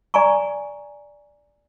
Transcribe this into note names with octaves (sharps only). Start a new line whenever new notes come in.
D5 G#5 A#5 C#6